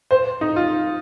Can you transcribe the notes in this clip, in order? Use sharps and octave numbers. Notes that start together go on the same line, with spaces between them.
C5
D#4
F4